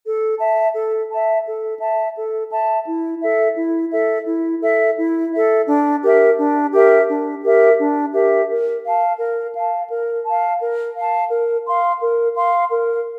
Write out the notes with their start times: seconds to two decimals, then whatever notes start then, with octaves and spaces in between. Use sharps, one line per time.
0.05 A4
0.39 E5 A5
0.74 A4
1.11 E5 A5
1.46 A4
1.80 E5 A5
2.15 A4
2.50 E5 A5
2.86 E4
3.21 A4 E5
3.56 E4
3.91 A4 E5
4.27 E4
4.62 A4 E5
4.97 E4
5.31 A4 E5
5.67 D4
6.02 G4 A#4 E5
6.37 D4
6.72 G4 A#4 E5
7.08 D4
7.42 G4 A#4 E5
7.78 D4
8.13 G4 A#4 E5
8.48 A#4
8.83 F5
8.88 A5
9.18 A#4
9.54 F5 A5
9.89 A#4
10.24 F5 A5
10.60 A#4
10.95 F5 A5
11.29 A#4
11.65 F5 C6
11.99 A#4
12.35 F5 C6
12.70 A#4